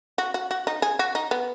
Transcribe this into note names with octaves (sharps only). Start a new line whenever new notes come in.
F#4
F#4
F#4
D#4
G#4
F#4
D#4
B3